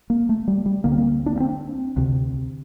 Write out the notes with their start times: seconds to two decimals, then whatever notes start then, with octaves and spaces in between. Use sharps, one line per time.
0.10 A#3
0.29 A3
0.48 G3
0.66 G3
0.84 D2 D3 A#3
0.92 C4
0.98 A#3
1.26 D4
1.36 A#3
1.40 C4
1.97 D2 C3